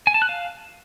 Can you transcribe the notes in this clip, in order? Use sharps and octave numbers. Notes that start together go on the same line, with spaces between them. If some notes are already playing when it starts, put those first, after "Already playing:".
G#5
A5
F#6
F5